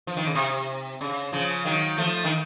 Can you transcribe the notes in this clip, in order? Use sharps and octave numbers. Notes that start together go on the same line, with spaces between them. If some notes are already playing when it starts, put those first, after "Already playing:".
F3
D#3
C#3
C3
C#3
C#3 F3
D#3 F#3
F3 A3
D#3